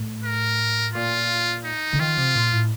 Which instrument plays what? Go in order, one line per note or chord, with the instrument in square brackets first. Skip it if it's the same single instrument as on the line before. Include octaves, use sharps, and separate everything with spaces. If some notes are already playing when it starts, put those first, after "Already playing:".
Already playing: [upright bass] A2
[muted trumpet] A#4
[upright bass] A#2 [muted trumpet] F4
[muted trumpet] D#4
[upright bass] D3
[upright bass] D#3 [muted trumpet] F4
[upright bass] C3
A#2
A2